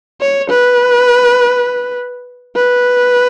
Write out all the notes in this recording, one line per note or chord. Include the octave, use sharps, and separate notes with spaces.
C#5
B4
B4